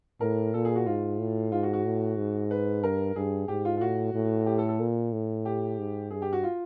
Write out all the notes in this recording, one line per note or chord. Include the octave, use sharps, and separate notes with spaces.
A2 A#4
A#2 A4
G#4
F#4
G#2 F4
A2
G#2 F4
F#4
F#4
A2
G#2
B4
G2 A#4
G2 G#4
G#2 G4
F4
F4
A2 F#4
A2
G4
A4
A4
A#2
A2
G4
G#2
G2 G#4
G4
F#4
F4